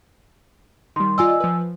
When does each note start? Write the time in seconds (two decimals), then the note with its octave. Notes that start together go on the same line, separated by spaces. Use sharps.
0.96 D#3 G3 C6
1.18 F4 D5 D#5 G#5 E6
1.40 F3 B4